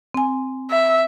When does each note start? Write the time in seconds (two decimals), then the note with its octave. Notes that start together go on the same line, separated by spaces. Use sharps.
0.14 C4 G#5
0.70 E5